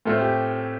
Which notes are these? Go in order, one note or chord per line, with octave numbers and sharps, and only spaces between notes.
A2 A3 C4 F4
G4